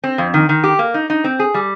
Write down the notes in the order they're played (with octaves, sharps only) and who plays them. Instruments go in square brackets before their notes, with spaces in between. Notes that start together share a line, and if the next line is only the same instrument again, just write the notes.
[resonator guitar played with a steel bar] C4
F2
D#3
D#3
G4
A#3
D#4
D#4
C4
G#4
G3